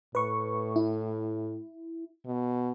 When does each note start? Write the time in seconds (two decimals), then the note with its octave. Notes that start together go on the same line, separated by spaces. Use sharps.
0.15 A2 B4 C#6
0.76 E4
2.26 B2